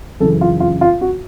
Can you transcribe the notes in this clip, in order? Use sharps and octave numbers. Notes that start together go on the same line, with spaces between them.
F#2 C#3 E3 A4
F4
F4
F4
F#4